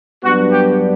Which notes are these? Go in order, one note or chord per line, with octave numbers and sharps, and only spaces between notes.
G2 F#3 B3 D4 F#4
G4